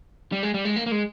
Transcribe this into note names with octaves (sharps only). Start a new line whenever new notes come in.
G3
G#3
G3
G#3
A#3
A#3
G#3